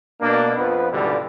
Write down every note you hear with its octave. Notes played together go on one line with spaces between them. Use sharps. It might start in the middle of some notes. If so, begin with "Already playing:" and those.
B2 A#3 D4
F2 F3 B3 B4
C#2 G2 B2 D3 E3 G3